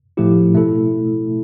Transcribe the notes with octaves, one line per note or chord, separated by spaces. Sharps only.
A2 F3 A3 E4 G4
B2 A3 E4 A4